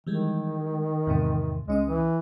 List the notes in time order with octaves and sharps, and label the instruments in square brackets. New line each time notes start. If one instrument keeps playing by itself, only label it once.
[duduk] D#3 [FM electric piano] E3 G3 G#3
[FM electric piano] E2 G#2 C3
[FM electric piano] C#2 C#4 D#6 [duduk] G#3
[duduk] E3